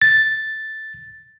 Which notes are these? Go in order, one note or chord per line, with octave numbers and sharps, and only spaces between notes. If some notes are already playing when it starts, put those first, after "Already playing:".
A6